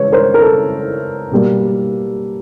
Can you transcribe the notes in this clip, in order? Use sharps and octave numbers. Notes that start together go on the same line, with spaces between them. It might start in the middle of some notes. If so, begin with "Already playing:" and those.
Already playing: C#3 E3 G#3 B4 C#5
A#4 C5
A#4
A4
B2 G3 A#3